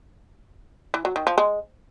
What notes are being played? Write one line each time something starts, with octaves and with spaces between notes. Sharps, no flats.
E3
F#3
D#3
F3
G#3